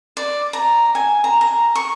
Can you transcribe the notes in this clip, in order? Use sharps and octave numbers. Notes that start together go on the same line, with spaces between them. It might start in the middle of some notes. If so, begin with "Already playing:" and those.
D5
A#5
G#5
A#5
A#5
C#6